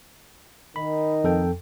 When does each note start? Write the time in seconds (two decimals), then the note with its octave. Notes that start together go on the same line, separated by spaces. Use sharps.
0.76 D#3 D#4 B5
1.24 F2 A4 G5